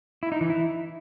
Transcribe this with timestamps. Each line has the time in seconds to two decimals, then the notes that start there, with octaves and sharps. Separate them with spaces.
0.23 E4
0.32 D#4
0.41 E3
0.50 E4